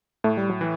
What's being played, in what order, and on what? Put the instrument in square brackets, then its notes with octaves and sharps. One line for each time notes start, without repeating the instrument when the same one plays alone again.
[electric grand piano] A2 [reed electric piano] A3
[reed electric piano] G3
F#3
[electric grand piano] E3